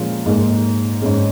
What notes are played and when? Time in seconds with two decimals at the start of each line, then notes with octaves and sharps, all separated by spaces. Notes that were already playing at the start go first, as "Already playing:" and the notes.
Already playing: A#2 F3 G#3 C#4 F4
0.26 G#2 G#3 A#3 D#4
1.02 G#2 G#3 C#4